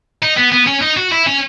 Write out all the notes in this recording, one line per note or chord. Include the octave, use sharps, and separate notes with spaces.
D#4
B3
B3
C#4
D#4
F#4
E4
C#4